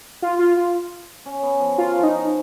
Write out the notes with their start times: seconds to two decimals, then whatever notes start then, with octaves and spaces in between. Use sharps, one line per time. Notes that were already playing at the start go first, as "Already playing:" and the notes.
0.22 F4
0.39 F4
0.57 F4
1.26 C#4
1.43 B3
1.60 F3
1.78 D#3 F4
1.95 F3
2.03 D#4
2.12 F3